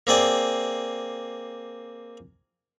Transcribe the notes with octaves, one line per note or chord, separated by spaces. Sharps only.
A#3 C4 G#4 D5